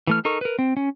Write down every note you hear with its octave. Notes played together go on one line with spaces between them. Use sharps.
E3 A3 F6
D#4 A4 A#4 C#6
A#4 B4
C4
C#4